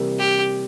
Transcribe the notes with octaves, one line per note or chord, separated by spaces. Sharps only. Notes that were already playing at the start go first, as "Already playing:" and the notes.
Already playing: C3 E3 G3 A#3
G4